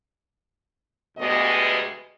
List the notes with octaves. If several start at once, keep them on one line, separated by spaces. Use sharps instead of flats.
D2 B2 G3 G#3 B3 D#5